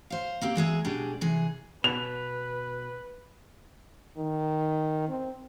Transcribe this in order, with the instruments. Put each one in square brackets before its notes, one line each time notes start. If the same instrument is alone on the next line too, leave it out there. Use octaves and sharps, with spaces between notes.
[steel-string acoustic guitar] C5 F5
A#3 C4 G4
E2 G#3 G#4 E5
B2 G#3 D4 G4 G#4
C3 E3 G#4
[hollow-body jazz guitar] B2 [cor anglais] B4 [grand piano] F7
[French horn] D#3
C4